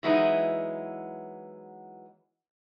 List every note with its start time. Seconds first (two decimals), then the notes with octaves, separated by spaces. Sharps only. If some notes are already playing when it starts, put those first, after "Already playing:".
0.03 E3 F#3 G#3 B3 D#4 E4